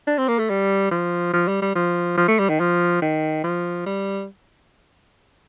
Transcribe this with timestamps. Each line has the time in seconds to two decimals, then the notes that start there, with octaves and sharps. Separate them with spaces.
0.07 D4
0.18 C4
0.29 A#3
0.39 A3
0.50 G3
0.92 F3
1.34 F3
1.48 G3
1.62 G3
1.76 F3
2.18 F3
2.28 A3
2.39 G3
2.50 D#3
2.60 F3
3.02 D#3
3.44 F3
3.86 G3